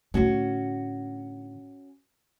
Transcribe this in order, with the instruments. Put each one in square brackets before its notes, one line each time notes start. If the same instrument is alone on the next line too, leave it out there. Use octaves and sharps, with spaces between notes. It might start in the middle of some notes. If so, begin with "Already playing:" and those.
[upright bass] A2 D3 [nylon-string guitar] C#4 F#4